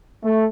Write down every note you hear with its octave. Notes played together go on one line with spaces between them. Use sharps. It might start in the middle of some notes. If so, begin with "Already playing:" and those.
A3